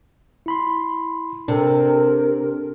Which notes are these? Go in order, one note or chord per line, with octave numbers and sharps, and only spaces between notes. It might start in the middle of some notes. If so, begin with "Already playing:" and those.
E4 B5 C6
C3 D4 A4 A#4